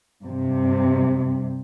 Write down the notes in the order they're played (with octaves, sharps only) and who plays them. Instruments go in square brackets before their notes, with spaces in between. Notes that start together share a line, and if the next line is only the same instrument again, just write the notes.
[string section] G2 C3